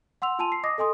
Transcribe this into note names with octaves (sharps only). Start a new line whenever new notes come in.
F#5 C6 E6 F7
F4 G#5 A5 C6 D#7 F7
C7
D#5 D6 D#6 A#6
A4 D#5 G#5 C6 D#6